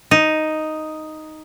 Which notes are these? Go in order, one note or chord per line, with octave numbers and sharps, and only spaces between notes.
D#4